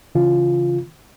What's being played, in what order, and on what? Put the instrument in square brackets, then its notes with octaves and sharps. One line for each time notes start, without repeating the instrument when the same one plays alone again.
[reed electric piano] C#3 E3 F4